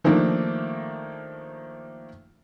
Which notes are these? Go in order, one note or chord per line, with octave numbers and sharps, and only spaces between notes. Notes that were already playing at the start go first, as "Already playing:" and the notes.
D#3 F3 A3 A#3 D4